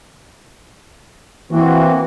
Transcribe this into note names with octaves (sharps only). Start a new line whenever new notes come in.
E3 A#3 C4 F#4